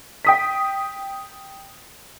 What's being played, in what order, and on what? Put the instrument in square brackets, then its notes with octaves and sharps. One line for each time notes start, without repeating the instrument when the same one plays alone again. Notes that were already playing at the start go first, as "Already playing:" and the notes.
[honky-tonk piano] G5 D#6 B6